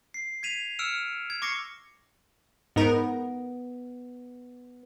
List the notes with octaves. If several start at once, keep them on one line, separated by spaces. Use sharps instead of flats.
C7
G#6 B6 D#7 F7
E6 F6 C#7 D7 E7
G#6
C#6 D6 A#6 C7 C#7
G#2 B3 D#4 A#4